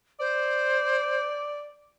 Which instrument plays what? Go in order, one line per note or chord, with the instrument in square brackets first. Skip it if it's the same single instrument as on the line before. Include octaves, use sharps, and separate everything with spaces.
[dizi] C5 [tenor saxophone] D5